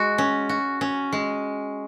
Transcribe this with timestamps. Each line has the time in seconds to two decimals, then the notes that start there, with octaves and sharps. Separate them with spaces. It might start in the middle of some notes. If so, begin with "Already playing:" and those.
Already playing: G#3 F#4
0.18 C#4
0.49 F#4
0.81 C#4
1.13 G#3